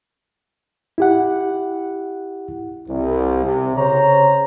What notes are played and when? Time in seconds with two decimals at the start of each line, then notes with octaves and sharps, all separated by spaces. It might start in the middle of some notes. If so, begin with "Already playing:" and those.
0.98 E4 G4 F#5
2.88 C2
3.44 C3
3.77 C#3 C5 C#5 A#5